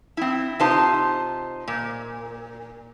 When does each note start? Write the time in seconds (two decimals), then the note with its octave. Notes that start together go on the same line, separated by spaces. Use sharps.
0.17 C4 E4
0.59 C3 D#4 F4 G4 C5 A5
1.68 A#2